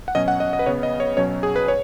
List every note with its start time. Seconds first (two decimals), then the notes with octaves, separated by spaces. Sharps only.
0.08 F#5
0.15 B2 F#3 C#4 D#5
0.28 F#5
0.40 D#5
0.53 D#5
0.59 B4
0.66 C#3 B3 C#5
0.83 D#5
1.00 C#5
1.17 B2 F#3 C#4 C#5
1.43 G#4
1.56 B4
1.68 C#5